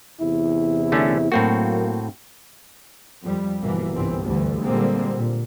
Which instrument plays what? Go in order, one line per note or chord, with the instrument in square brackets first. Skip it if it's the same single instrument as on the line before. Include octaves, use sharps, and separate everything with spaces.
[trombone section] E2 C3 E4
[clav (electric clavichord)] D3 A3 C#4
[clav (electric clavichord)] A2 C4 F#4 [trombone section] F#3 A#3
[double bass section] F2 G3
G1 B2 E3 A#3
G1 C2 G#2 E3 C4
D2 G2 D3 E3 G3
A#2 D3 G3 G#3 A#3 C4
A#2